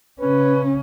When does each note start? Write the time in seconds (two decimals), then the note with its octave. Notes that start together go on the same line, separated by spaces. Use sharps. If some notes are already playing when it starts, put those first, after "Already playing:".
0.20 C#3 C#4 B4